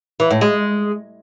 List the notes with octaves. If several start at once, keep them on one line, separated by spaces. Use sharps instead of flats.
E3
A2
G#3